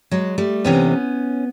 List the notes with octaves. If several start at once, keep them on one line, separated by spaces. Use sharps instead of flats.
F#3 G#3
G3 A3
D2 C3 E3 B3 C#4